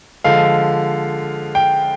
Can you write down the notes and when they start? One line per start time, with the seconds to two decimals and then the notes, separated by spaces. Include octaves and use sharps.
0.24 D3 F3 G#3 F5
1.55 G5